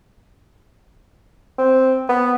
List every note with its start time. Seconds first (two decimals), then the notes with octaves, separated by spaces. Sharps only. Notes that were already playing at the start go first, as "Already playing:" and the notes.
1.58 C4
2.09 B3